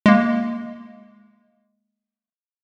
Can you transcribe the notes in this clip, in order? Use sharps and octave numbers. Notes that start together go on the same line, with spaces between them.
G#3 A#3